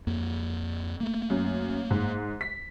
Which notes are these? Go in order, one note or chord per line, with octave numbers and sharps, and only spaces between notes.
F2 A#3
A3 A#3
F#2
G#2
B6